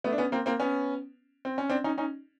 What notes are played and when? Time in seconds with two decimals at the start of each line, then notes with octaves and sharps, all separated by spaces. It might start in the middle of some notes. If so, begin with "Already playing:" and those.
0.04 A3 B3
0.12 D4
0.18 B3 C#4
0.32 A#3 C4
0.46 A#3 C4
0.60 B3 C#4
1.45 C4
1.58 C#4
1.69 C4 D4
1.84 C#4 D#4
1.98 C#4 D#4